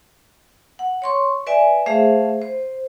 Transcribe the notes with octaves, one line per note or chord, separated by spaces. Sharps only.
F#5
C#5 C6 C#6
B4 D5 E5 G#5
A3 G#4 C5 E5 F5
C5